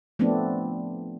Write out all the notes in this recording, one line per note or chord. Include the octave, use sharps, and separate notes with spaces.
F3 A3 B3 C4 D4